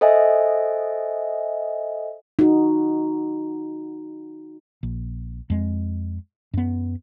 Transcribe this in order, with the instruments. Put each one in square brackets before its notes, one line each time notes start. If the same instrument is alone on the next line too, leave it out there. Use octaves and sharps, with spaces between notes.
[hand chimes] A4 C5 D#5 E5 G#5
[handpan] D#4 F#4
[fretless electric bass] A#1
F2 G#3
F#2 B3